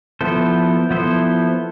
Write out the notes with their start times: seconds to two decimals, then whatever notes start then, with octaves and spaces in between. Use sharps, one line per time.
0.21 F3 B3 E4 A4 C5
0.91 F3 B3 E4 A4 C5